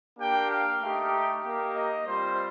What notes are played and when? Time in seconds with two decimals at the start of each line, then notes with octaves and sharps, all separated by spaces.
0.18 A#3 D4 G4 G5
0.50 F5
0.82 A3 D#4 G4
1.43 A#3 D#4 G4
1.75 D#5
2.06 G3 C4 F4 C5